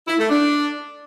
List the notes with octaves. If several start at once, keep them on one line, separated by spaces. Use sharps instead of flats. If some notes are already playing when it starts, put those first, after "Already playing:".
E4
A3
D4